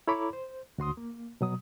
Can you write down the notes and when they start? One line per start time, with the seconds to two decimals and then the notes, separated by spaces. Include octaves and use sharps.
0.08 E4 A4 C#5 A#5 B5 D6
0.33 C5
0.78 D2 F#4 C6 D#6
0.97 A#3
1.41 B2 F#3 D#6